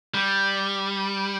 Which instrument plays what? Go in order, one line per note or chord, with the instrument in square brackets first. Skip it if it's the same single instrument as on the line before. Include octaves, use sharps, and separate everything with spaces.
[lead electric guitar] G3